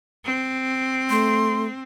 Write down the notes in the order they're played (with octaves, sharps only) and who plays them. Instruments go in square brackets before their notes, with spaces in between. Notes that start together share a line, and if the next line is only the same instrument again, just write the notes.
[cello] C4
[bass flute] A3 [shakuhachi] C6